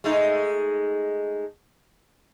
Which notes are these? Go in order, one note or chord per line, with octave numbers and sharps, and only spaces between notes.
G#3 A3 D#4